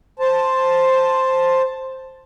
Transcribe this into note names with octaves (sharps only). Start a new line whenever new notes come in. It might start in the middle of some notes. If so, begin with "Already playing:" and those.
C5 A5